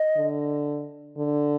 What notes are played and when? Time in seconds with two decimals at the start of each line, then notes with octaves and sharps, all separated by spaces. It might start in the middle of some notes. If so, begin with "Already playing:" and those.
Already playing: D#5
0.17 D3
1.17 D3